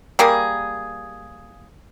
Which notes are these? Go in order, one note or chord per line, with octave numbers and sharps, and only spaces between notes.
G3 A#3 G#4